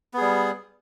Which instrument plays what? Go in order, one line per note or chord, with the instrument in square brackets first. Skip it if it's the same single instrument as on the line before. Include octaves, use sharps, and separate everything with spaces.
[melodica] B3
G#4
G3